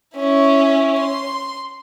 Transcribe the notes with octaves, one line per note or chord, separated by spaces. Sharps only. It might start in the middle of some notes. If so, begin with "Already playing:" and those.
C#4 E4
C6